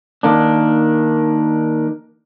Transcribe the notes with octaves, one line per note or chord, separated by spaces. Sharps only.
D#3 A#3 D4